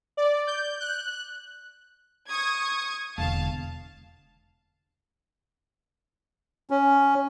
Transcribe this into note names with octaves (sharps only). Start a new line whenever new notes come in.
D5
G6
F#6
C#6 D#6 G#6
E1 D3 F5 A5
C#4